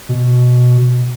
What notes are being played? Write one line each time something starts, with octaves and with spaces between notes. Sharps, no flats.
B2